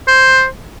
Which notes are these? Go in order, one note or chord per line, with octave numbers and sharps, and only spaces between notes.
C5